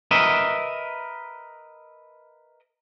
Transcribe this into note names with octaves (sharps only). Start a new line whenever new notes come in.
A#4 B4 D#5 E5